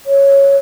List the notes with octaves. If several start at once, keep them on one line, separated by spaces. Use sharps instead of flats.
C#5